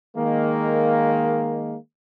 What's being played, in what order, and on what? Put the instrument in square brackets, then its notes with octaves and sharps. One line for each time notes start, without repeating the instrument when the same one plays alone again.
[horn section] D#3 G#3 A#3